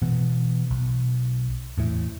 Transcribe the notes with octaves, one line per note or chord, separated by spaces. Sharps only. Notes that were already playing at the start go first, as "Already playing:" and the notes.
B2 E3 B3
B1
E2 A2 E3